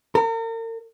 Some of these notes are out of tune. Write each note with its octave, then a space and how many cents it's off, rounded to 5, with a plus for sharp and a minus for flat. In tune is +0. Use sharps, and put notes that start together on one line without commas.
A#4 -40